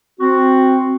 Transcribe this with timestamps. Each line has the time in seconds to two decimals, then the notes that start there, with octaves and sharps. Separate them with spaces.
0.20 C4 F#4